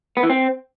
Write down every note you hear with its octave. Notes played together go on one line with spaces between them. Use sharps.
B3
E3
C4